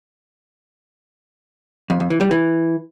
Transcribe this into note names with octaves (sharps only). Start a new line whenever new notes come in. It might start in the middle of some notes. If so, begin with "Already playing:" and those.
F2
F2
E3
G3
E3